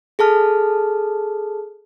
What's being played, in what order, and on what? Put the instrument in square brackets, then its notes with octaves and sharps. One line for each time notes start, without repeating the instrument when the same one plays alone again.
[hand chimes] G#4 A4 A5 F6